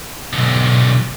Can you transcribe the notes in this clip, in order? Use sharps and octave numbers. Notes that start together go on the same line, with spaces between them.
B1 D3